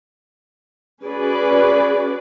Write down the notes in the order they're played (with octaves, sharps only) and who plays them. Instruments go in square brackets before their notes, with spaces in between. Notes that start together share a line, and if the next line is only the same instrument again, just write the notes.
[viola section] C#4 F#4 G#4 B4 D5